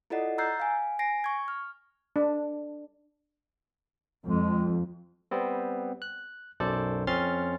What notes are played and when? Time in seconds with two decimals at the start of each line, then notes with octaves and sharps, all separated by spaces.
0.10 E4 F4 A4 D5 D#5 F#5
0.38 A#5 E6 F#6 G6 A6 C7
0.60 F5 G#5
0.99 G#5 A#6 C7 D7
1.24 C#6 G#6
1.48 F6
2.16 D4
4.26 F2 G#3
5.31 G3 B3 C4
6.02 F#6
6.60 B1 F#2 A4 C5 D5
7.07 F2 C4 C#4 C6 F6 A6